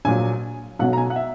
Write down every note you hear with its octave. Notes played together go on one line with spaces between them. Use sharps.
A#1 A#2 F#3 G#5
B1 B2 F#3 F#5
A#5
G#5
F#5
E5